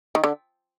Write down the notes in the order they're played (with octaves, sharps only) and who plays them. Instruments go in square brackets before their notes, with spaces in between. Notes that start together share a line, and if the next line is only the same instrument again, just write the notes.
[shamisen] D#3
D3